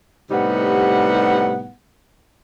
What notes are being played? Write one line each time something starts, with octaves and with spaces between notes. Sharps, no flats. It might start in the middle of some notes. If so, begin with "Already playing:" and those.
A2 C3 G3 B3 D#4 F#5